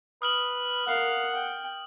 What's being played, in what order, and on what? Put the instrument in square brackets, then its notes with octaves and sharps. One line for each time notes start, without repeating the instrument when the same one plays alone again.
[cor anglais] B4 [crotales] D#6 F6 F#7
[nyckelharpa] A#4 F5 [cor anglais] F#5
[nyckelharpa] G5